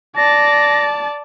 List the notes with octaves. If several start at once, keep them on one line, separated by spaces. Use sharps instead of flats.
D5 A5 A#6